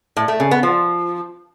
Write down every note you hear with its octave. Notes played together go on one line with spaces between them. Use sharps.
A2
A3
C#3
B3
F3